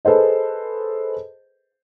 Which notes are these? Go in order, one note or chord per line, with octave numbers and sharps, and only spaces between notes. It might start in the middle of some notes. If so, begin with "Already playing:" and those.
G#4 A4 B4 C5 D#5